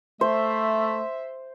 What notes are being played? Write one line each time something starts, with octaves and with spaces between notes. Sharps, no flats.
A3 C5 E5